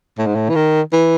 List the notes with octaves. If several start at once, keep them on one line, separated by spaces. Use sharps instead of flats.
A2
G#2
A2
E3
D#3
E3